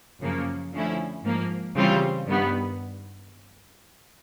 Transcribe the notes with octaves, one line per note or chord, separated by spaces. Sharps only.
F#2 C#3 F3 A#3
D3 F3 A3 C#4 E4
G#2 F3 A#3
C#3 E3 G3 C4 F4
G2 D#3 G3 B3